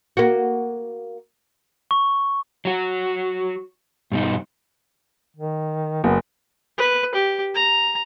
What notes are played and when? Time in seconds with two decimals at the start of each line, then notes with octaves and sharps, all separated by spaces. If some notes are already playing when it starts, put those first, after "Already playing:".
0.17 A#3 F#4
1.91 C#6
2.65 F#3 F#4
4.12 G2 B2 D#4
5.36 D#3
6.04 F#1 B3
6.78 B4
7.15 G4
7.55 A#5